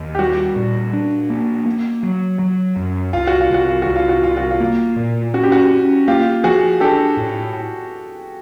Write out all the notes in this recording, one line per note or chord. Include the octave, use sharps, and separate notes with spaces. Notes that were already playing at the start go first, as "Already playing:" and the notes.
Already playing: D#2
G4
G3 F#4
A#2
D4
A#3
A#3
F#3
F#3
F#2
C2 F4
F#4
F4
C2 F#4
F4
C2 F#4
F4
F#4
C2 F4
F#4
F4
A#3
A#2
C#4 F#4
G4
F#4
C#4
A#3 F4 G4
F3 F#4 G#4
D4 G4 A4
A2